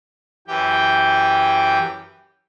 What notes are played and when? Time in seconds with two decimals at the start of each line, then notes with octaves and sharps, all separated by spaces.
0.48 F#2 E3 G4 G5